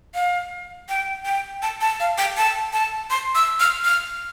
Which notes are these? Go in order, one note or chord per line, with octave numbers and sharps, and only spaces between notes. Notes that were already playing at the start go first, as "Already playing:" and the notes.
F5
G5
G5
A5
A5
F5
G5
A5
A5
C6
E6
F6
F6